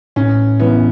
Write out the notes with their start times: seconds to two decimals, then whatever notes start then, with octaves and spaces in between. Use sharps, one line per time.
0.16 A2 C#4
0.60 E3 G#3 B3 C#4 E4